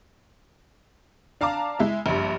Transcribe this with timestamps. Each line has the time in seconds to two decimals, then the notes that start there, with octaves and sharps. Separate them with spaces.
1.41 D4 F5 A5 A#5 D6
1.79 G#3 E4 E5
2.06 A#1 G2